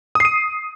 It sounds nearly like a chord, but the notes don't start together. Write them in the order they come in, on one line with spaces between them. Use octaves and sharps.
D#6 C7 D#7